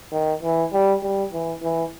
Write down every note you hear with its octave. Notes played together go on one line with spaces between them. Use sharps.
D#3
E3
G3
G3
E3
E3